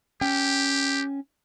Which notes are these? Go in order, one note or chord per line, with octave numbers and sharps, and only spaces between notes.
C#4 G4 G5